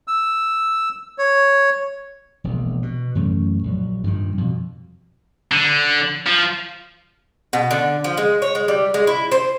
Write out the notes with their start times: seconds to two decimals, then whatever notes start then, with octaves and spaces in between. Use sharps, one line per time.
0.08 E6
1.18 C#5
2.44 E1 A#1
2.82 B2
3.15 F#2 E3 A3 C#4
3.63 A#1 F#3
4.04 G2 A#2 D3 D#3
4.38 F2 B2
5.52 D3
6.27 F3
7.53 B2
7.71 D3
8.04 F3
8.17 G#3
8.42 C#5
8.55 G#3
8.68 G3
8.94 G#3
9.07 E4
9.32 C5